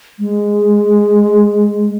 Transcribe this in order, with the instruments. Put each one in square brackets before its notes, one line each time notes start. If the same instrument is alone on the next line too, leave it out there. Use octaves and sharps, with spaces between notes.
[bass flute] G#3